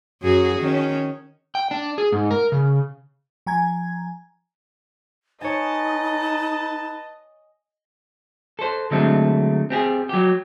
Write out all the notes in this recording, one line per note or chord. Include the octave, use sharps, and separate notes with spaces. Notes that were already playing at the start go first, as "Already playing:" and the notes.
F#2 F#4 G#4
D#3 C#4
G5
D4
G#4
G#2
A#4
C#3
F3 G#5 A#5 G#6
D#4 B4 C#5 D#5 G#5 A5
A4 C5
D3 F#3 G#3 A3 C4 D4
C4 G4 G#4
F#3 G4